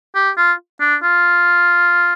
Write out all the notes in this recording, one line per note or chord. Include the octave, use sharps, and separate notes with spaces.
G4
F4
D4
F4